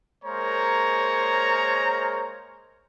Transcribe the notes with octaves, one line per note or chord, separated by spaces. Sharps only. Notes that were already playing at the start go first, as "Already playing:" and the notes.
G#3 A#3 A#4 C5 C#5 A#5